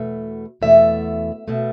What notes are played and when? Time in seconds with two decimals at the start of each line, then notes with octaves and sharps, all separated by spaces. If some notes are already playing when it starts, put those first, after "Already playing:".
Already playing: E2 B2 A3
0.62 E2 B2 A3 E5
1.48 B2 A3